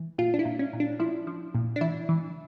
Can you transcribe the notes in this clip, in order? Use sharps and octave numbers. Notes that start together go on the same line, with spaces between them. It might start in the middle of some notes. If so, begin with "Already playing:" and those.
Already playing: E3
A#2 F4
D4
E4
A#2
C#4
A#2
D4
F3 E4
F3
A#2
D4
E3 E4
E3